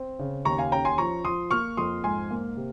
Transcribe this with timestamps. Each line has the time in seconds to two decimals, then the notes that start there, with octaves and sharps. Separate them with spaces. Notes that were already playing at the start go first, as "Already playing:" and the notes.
Already playing: C4
0.19 C#3
0.45 D#2 A#5 C#6
0.58 F5 G#5
0.72 C#4 G5 A#5
0.85 G#5 C6
0.98 F3 A#5 C#6
1.24 F3 C6 D#6
1.51 A#3 C#6 F6
1.77 F2 C6 D#6
2.03 G#2 G#5 C6
2.30 A#3
2.57 C3